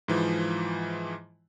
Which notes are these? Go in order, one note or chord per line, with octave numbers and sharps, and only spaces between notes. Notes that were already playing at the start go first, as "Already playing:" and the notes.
G#2 E3 F3